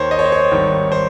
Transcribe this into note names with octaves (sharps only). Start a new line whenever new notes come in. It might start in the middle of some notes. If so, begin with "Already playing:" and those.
Already playing: D#2 D#3 C5 C#5
D#5
C#5
C5
C#5
G#1 G2 D#3
C5